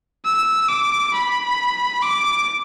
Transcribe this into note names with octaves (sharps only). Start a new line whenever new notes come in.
E6
D6
B5
D6